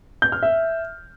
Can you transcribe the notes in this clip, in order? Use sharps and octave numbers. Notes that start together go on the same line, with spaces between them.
G6
F6
E5